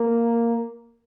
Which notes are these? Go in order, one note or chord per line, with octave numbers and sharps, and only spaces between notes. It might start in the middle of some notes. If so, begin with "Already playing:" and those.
Already playing: A#3